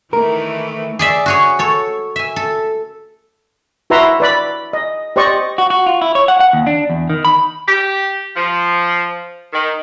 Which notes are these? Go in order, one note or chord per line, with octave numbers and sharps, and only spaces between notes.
D#3 E3 A3 A#4
G#4 D5 E5
F#4 G#4 C#5
A4 C#5
E5 G#5
A4
E4 F#4 B4 E5 A#5 C6
B4 D5 B5
D#5
G4 C5 D5 D#5 C#6
F#4
F#4
F4
E4
C#5
F#5
F#5
D#2
D4
E2
D#3
B5
G4
F3
D#3